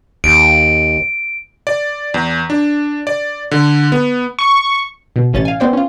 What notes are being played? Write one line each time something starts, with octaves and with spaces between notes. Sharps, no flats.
D#2 D7
D5
E2
D4
D5
D3
B3
C#6
B2
A1 C#4 A6
F5 G#5
B3 C4 C5 D5 G5
C#4 F4